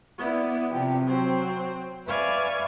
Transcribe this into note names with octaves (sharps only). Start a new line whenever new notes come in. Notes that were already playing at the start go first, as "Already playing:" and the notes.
B3 E4 D5
C3 F3 G4
F#3 C4 C5
B4 D5 E5 F5 G#5 C#6